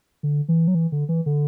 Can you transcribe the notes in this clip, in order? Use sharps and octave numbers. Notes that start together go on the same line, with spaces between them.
D3
E3
F#3
E3
D3
E3
D3